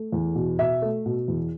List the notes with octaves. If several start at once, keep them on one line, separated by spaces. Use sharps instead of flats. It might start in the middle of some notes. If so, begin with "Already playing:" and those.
Already playing: A3
E2
B2
B2 E5
A3
B2
E2